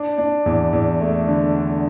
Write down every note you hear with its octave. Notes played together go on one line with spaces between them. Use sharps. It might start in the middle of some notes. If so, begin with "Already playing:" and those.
Already playing: D4
D4
E2
E2
A3
D3
D3